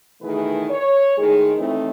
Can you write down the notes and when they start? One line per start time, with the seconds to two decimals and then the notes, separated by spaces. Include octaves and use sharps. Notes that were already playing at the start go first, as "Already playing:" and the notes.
0.22 B2 D#3 E3 A3 G#4 B4
0.70 C#5
1.18 A2 D#3 G#3 G#4
1.58 D#2 A2 E3 A3 C4 D#4